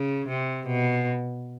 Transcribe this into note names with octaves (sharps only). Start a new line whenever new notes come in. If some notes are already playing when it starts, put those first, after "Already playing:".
Already playing: C#3
C3
B2